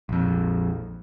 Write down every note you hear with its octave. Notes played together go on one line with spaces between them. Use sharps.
A#1 F2